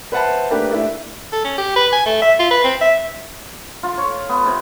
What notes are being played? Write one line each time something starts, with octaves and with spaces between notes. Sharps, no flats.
B4 C5 E5 F#5 A5 B5
A3 A#3 D4 G4 B4
A3 D4 E4
A4
C#4
G4
B4
G#5
A3
E5
F4
B4
C4
E5
F4
C#5
B3
C3